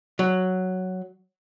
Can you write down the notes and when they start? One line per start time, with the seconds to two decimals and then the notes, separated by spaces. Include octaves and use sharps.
0.19 F#3